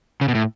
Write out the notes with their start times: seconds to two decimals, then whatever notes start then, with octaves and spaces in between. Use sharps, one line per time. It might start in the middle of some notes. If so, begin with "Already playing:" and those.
0.21 C#3
0.28 B2
0.35 A2